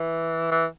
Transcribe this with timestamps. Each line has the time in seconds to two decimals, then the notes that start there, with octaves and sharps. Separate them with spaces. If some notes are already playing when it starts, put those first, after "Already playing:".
Already playing: E3
0.51 E3